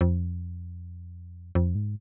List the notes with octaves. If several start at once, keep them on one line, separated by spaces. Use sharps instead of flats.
F2
F2
G#2